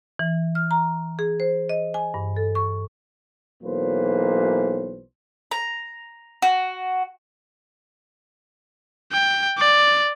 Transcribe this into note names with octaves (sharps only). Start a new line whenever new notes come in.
E3
F6
A#5
G#4
C5
D#5
G#5
G2
A4
C#6
B1 E3 F#3 A#3 B4 C5
A#5
F#4
G5
D5